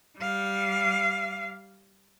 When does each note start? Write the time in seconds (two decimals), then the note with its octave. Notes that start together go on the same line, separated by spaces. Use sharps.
0.18 G3 F5